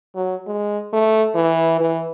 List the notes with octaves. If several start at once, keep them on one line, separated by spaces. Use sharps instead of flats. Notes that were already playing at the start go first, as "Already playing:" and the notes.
F#3
G#3
A3
E3
E3